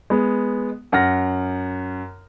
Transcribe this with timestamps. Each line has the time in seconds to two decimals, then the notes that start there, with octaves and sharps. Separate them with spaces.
0.10 G#3 B3
0.92 F#2 F#5 F6 A#6